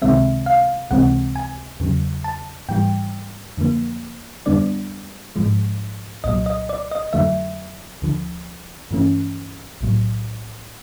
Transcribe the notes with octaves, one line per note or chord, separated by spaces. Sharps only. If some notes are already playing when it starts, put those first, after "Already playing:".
C#2 C3 D#3 G#3 C4 E5
F5
C#2 C3 E3 G#3 C4 F#5
G#5
E2 C#3 F#3
A5
G#2 E3 G3 G5
F2 D3 F3 A#3
F2 D3 G3 B3 D4 D5
G#2 F3 G#3
C2 A#2 F#3 D#5
D#5
D5
D#5
F2 D3 F#3 A3 E5
D2 D3 F3
G2 E3 A3 C#4
B1 A2 F#3